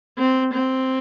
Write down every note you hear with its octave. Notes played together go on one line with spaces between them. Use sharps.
C4
C4